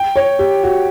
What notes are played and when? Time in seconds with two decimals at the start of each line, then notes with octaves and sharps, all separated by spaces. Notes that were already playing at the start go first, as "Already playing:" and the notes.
Already playing: G5
0.16 C#5
0.39 G4
0.64 F#4